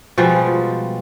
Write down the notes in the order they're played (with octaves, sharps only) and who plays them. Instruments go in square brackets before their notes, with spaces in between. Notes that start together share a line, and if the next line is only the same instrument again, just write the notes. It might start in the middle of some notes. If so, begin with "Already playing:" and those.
[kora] B2 F3 G3 G#3